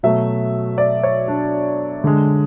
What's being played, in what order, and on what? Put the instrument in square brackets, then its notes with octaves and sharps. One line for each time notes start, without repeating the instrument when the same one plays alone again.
[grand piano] B2 F#3 A3 E5
D5
C#5
D4
D3 G#3